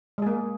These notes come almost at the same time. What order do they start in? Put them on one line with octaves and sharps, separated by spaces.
G#3 G#4 A#3